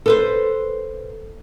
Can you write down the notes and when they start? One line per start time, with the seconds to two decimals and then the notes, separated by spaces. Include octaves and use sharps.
0.06 A4 B4 C5